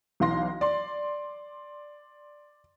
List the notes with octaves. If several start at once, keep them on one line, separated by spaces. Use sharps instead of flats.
B1 E3 F5 C6 A#6
D5 C6